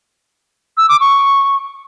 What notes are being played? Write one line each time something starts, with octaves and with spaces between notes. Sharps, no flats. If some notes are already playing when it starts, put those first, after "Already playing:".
E6
D6
C#6